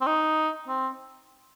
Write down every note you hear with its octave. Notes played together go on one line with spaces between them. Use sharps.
C4
D#4
C4